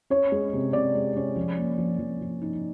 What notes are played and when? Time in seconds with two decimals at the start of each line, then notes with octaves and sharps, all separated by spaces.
0.10 C#4 C#5
0.32 G#3
0.53 C3
0.73 C3 D5
0.95 G#3
1.16 C#4
1.36 F3
1.58 A#3
1.78 F3
1.99 F3
2.21 F3
2.42 D#4